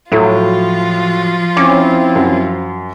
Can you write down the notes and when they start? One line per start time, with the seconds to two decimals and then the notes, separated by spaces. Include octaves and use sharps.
0.12 A2 F3 F#3 F4
1.57 C4 C#4 E4 D6
2.16 F#2